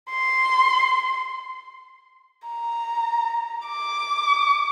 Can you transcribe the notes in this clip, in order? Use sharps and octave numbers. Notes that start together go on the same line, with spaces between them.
C6
A#5
D6